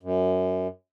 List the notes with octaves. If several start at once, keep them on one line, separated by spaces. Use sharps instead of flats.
F#2